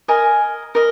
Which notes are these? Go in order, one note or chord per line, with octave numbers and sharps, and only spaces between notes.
A#4 D#5 G#5
A#4 D#5